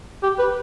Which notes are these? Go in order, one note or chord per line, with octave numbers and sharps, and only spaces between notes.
G4
B4